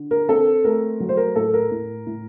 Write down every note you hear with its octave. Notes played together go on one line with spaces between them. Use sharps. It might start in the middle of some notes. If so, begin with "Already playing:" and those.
Already playing: D3
A#4
C4 A4
A3 A#4
F#3
C5
A#4
A2 A4
A#4
A2
A2